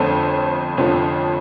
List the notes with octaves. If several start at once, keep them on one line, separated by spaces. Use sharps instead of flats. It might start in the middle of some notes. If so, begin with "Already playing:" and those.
Already playing: G1 F2 D3 F3 A3 C5
G1 F2 D3 F3 A3